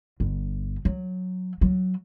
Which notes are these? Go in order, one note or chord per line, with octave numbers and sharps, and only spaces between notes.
G1
F#3
F#3